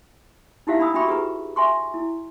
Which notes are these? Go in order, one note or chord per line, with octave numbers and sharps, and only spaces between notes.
D#4 E4 G4 E5 F5
D4 B5 D#6 E6
D4 F#4 E5 G5 B5 C#6
G4 G#4 B4 A#5
E5 G#5 C6 C#6
E4